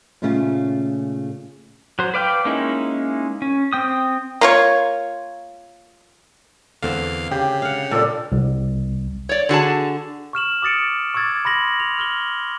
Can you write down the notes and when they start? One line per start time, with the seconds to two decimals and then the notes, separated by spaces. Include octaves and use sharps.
0.22 A#2 C#3 A3 C#4 F4
1.99 F#3 C5
2.14 B4 D5 F5 G5
2.45 G#3 A#3 C#4 D#4 E4
3.42 C#4
3.73 C4 G5 D#6
4.41 A#3 F4 C#5
6.82 E2 D3 C4 F5
7.31 C#3 G4
7.62 F5 F#5
7.91 A#2 A4 D5
8.32 C2
9.29 C#5 D5
9.49 D3 F#4 G#4 A5
10.33 C#6 F6 E7 F#7
10.62 D6 D#6 A6 C#7 D7
11.14 C#6 D6 E6 G#6 A6
11.45 B5 C6 A#6 F#7
11.80 F7
11.99 F6 F#7 G7